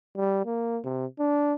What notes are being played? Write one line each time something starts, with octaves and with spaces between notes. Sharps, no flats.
G3
A#3
C3
D4